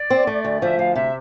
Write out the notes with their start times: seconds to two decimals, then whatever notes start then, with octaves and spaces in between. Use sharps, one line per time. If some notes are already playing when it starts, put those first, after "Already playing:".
Already playing: D5
0.10 C4
0.27 A3
0.44 D2
0.61 F3 E5
0.79 D2 F5
0.95 C3 E5